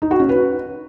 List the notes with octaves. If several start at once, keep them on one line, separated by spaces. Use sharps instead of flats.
D#4
F#4
C#4
B4